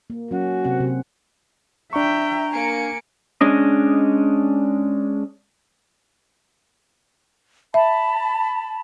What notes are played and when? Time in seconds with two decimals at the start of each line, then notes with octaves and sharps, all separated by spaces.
0.10 A#3
0.31 F#3 C#4 F#4
0.65 C3 C4 F#5
0.80 C3
1.93 D4 E5 G5 A#5 C#6
2.52 A#3 G#5 C#7 D7
3.41 G#3 C#4 D4 D#5
7.74 E5 A5 B5